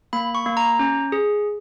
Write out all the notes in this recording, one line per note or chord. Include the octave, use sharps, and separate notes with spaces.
A#3 B5
C#6
A#3
A#5
C#4
G#4